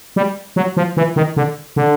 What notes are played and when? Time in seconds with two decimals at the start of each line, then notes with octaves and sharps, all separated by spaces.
0.16 G3
0.56 F#3
0.77 F3
0.97 E3
1.16 D#3
1.37 D3
1.76 D3